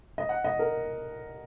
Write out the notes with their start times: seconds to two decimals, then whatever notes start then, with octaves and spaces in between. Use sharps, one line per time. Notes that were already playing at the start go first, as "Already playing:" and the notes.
0.18 D#5
0.29 F#5
0.44 D#5
0.59 A#4